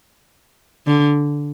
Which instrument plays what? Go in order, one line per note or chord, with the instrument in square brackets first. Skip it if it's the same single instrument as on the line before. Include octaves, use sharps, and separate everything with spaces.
[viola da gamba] D3